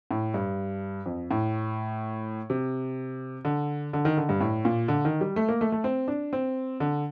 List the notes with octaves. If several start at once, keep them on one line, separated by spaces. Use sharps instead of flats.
A2
G2
F2
A2
C3
D3
D3
D#3
D3
G2
A2
A#2
D3
D#3
G3
A3
A#3
A3
A3
C4
D4
C4
D3